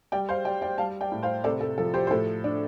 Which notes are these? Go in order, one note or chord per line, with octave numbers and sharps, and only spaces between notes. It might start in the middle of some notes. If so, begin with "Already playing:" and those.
G3 D5 G5
C5 F5
G3 D5 G5
D5 G5
G3 F5 A5
D5 G5
A2
C5 F5
C3 A4 D5
A4
F3 A4
G4 C5
C5
A2 A4
D4